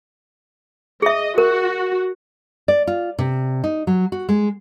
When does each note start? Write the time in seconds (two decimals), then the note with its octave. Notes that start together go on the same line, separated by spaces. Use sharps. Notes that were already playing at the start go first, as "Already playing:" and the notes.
1.02 G#4 D#5 E5
1.38 F#4 A#4
2.68 D5
2.87 F4
3.19 C3
3.64 D#4
3.87 F#3
4.12 F#4
4.29 G#3